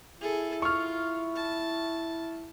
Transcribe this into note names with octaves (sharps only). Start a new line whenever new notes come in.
E4 G#4 A4
F4 C#6 F6
A5